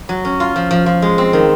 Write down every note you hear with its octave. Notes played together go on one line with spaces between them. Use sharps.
F#3
C#4
F4
F3
F3
F3
G#3
C4
D#3